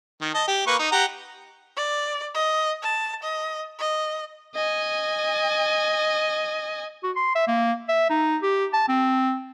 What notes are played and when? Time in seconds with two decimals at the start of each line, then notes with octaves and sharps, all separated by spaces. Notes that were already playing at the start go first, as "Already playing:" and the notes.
0.22 D#3
0.34 D#5 A5
0.48 G4
0.67 A#3 B4 C#6
0.79 D#4
0.92 G4 F#5 A#5
1.77 D5
2.34 D#5
2.83 A5
3.23 D#5
3.80 D#5
4.55 D#5 G#5
7.03 F#4
7.16 C6
7.35 E5
7.48 A#3
7.89 E5
8.10 D#4
8.43 G4
8.73 A5
8.89 C4